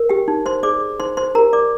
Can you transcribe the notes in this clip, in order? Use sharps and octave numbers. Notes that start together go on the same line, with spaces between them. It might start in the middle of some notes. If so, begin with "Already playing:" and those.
Already playing: A#4
G4 G5
D#4
C5 C6
G#4 C5 D5 D6
D#4 C5 C6
C5 C6
G4 A#4 C5 A#5
D5 D6